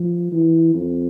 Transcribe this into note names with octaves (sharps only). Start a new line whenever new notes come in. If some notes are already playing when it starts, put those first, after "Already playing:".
Already playing: F3
E3
F2